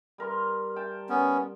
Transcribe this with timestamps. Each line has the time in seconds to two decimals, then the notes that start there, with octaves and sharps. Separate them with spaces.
0.18 G3 A#4 C6
0.76 G5 A5
1.09 B3 C#4